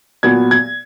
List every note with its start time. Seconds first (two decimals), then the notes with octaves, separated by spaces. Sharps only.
0.23 A#2 F#3 B3 G#6
0.51 G#6